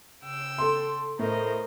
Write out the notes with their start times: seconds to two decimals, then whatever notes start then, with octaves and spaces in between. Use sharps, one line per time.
0.22 C#3 G5 E6
0.58 A4 C6
1.19 A2 A#4 C5 D#5